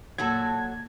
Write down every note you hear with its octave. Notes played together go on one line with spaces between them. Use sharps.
A#2 F#3 F#4 A4 A5 G#6